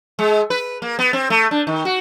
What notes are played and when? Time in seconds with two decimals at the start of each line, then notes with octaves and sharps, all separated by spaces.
0.19 G#3
0.50 B4
0.82 A#3
0.99 B3
1.13 C4
1.30 A3
1.51 D4
1.67 D#3
1.85 F#4